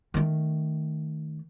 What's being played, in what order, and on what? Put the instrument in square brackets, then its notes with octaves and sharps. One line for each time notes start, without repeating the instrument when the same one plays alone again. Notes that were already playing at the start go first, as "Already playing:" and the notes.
[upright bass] D#3 A3